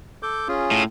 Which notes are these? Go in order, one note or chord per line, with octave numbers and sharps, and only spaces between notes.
A4 D6 G6
C#4 F4 G#4
A2